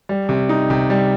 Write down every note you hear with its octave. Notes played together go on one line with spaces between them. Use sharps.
G3
C3
D#4
C3
G3